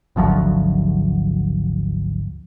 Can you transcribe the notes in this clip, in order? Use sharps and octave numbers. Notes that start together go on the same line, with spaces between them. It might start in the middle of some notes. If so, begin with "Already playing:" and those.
G#1 D2 F3 F#3